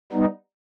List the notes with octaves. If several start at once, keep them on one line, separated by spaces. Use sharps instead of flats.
G3 B3 D#4